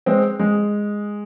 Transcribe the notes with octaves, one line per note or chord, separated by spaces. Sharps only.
G#3 C4
G#3